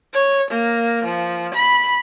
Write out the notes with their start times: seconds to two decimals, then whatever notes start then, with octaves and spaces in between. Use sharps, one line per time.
0.14 C#5
0.51 A#3
1.04 F3
1.54 B5